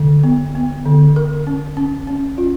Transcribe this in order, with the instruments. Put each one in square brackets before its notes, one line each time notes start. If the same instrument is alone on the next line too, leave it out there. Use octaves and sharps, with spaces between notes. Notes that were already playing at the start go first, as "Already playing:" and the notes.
Already playing: [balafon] D3
B3
B3
D3
A#4
C#4
C#4
C#4
F4